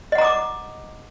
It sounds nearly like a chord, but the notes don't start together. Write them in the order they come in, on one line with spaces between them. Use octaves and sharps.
D#5 F#5 A#5 D#6 D6